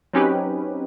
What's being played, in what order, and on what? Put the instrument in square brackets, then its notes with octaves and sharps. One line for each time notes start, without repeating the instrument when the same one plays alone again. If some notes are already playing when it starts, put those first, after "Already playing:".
[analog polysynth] F#3 C4 C#4 D#4 G4 B4